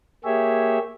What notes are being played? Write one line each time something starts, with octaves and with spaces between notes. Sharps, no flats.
A#3 G4 G#4 C#5 E5